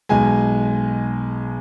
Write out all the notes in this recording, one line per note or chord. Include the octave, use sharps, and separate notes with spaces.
B1 B2 G#3 G#5